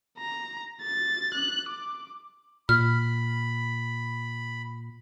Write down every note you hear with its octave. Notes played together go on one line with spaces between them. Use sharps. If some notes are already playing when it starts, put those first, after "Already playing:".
A#5
A6
F#6
D6
A#2 B5 F6